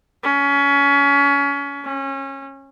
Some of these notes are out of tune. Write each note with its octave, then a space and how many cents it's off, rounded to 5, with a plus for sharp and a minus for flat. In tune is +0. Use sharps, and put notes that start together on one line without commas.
C#4 +25
C#4 -25